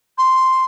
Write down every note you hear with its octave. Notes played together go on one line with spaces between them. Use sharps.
C6